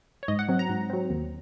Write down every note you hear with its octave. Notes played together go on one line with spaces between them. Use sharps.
C#5
G#2 D#5
F#5
F#3 C4
A#5
G#2
F#3 C4
D#2